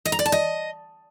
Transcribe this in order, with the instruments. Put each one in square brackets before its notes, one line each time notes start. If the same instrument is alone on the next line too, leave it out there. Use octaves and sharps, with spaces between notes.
[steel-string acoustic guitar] D#5
A#5
D5
A5
D#5